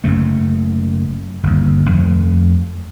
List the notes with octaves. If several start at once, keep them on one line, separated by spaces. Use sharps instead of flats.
F#1 F#2 C#3 A3
G1 D#2
F2 A3